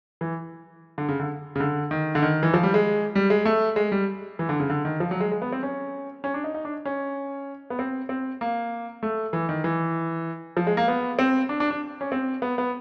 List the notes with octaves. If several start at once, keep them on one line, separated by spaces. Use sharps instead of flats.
E3
D3
C#3
D3
C#3
D3
D#3
D3
D#3
E3
F3
G3
G#3
G3
G#3
A3
G#3
G3
E3
D3
C#3
D3
D#3
F3
F#3
G#3
G#3
B3
C4
C#4
C#4
D4
D#4
D#4
D4
C#4
B3
C4
C4
A#3
A3
E3
D#3
E3
F3
G#3
A#3
B3
C4
D4
D4
D4
C#4
C4
B3
B3